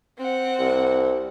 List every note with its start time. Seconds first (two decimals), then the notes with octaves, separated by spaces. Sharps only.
0.18 C4 F#5
0.59 C2